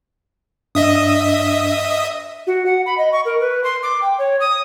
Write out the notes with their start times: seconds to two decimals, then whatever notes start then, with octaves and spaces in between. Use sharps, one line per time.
0.75 G2 D4 D#5 E5 D#6
2.47 F#4
2.66 F#5
2.86 B5
2.98 D#5
3.12 C#6
3.25 A#4
3.40 B4
3.64 C6
3.83 D6
4.02 G5
4.19 C#5
4.40 D#6